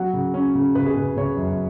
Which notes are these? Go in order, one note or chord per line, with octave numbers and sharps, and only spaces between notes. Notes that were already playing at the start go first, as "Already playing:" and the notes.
Already playing: F#3 F#5
C#3
C#4
C#3
C#3 B4
G#4
C#3 B4
C#3 C#5
F#2